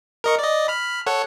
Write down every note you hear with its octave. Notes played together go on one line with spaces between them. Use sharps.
A#4 D#5 C#6
D5 D#5
B5 F6
A4 C#5 F#5